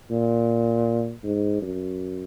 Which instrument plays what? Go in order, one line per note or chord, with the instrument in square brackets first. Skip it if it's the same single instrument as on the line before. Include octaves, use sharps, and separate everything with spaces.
[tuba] A#2
G#2
F#2